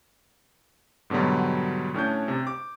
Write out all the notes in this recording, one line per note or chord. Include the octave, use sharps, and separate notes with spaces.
G#2 B2 D3 F#3 G3
A2 C#4 D4 G6
C3
D6